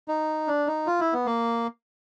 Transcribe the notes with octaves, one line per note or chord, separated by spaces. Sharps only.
D#4
D4
D#4
F4
E4
B3
A#3